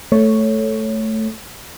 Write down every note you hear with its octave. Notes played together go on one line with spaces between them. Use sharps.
A3 C#5